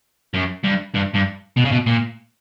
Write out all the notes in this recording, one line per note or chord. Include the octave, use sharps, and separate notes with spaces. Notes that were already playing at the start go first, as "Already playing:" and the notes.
F#2
G2
G2
G2
B2
C#3
B2
A#2